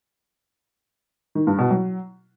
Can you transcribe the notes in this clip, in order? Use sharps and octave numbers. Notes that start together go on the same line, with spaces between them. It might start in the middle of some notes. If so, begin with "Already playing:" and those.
D#3
G2
B2
F#3